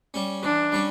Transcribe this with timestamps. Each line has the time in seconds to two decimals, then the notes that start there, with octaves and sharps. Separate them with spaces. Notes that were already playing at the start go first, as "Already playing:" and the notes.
0.14 G3 C#4
0.43 E3 D4
0.72 G3 C#4